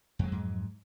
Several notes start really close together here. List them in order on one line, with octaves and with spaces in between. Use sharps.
F2 G#3 F#3 G#2